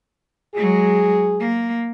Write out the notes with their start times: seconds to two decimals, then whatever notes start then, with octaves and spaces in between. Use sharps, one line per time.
0.55 F#3 G#3 G#4
1.40 A#3